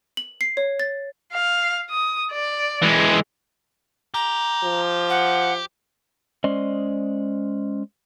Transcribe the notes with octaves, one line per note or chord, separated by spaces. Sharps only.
F#7
C7
C#5
A6
F5
D#6
D5
E3 G#3
G4 A#5
F3
F#5
G#3 C#4 C5 D5 D#5